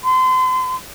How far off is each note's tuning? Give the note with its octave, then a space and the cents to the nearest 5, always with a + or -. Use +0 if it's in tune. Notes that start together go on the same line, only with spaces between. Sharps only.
C6 -35